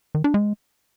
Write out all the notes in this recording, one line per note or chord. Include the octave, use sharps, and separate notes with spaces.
D#3
D4
G#3